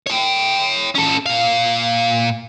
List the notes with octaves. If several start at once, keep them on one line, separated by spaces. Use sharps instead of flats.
C#5 G5
C#4 A4
A#2 F5